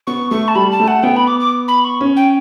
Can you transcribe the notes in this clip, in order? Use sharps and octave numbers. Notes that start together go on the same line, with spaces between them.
B3 C#6
A3 C#6
A5
G3 B5
A5
A3
F#5
B3 G5
B5
D6
D6
B5
C#6
C#4
G5